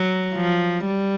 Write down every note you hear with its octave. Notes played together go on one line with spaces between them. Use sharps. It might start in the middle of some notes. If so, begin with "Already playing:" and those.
Already playing: F#3
F3
G3